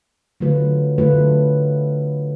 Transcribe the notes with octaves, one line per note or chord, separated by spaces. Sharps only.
D3 F#3 A3 F4 B4
D3 F#3 A3 F4 B4